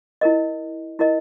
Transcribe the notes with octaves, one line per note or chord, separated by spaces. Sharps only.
E4 A#4 D#5
E4 A#4 D#5